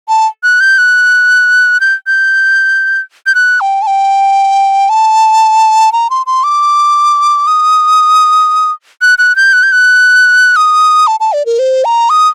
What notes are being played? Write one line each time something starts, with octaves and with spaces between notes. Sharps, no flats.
A5
F#6
G6
F#6
G6
G6
G6
F#6
G5
A5
G5
A5
A#5
C6
C6
D6
D#6
F#6
F#6
G6
F#6
G6
F#6
D#6
A5
A5
D5
A#4
C5
A#5
D#6